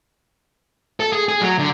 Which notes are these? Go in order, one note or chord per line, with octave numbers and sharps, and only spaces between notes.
A4
G#4
G#4
F#3
D3